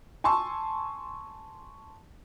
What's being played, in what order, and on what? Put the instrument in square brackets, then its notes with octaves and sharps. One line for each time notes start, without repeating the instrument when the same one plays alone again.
[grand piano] G#5 A5 C6 C#6 E6